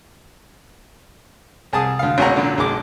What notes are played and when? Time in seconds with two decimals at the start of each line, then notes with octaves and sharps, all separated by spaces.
1.73 C2 G#4 A5 D#6
1.99 D2 F5
2.18 G#1 B2 C#4 F#4 F#5 A#5
2.36 F#2 A#2 D3
2.58 B1 G#3 D6